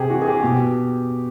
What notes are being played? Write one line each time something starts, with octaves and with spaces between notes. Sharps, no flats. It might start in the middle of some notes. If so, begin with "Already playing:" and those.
Already playing: C3 G4 G#4
E3 F#4
G#4
G4
B2 G4